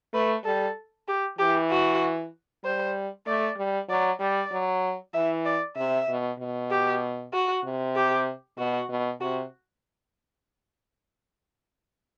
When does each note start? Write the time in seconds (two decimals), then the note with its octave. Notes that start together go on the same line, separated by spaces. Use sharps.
0.14 A3 B4
0.45 G3 A4
1.08 G4
1.39 E3 G4
1.70 F#4
2.64 G3 C5
3.27 A3 D5
3.57 G3
3.89 F#3 D5
4.20 G3 D5
4.52 F#3
5.14 E3 E5
5.45 D5
5.77 C3 E5
6.09 B2
6.40 B2
6.71 G4
7.33 F#4
7.64 C3
7.96 G4
8.58 B2 F#4
8.90 B2
9.21 C3 F#4